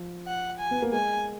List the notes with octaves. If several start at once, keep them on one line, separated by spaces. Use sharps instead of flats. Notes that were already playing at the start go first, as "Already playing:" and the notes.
Already playing: F3
F#5
G#5
B3
A#3
G#3 G#5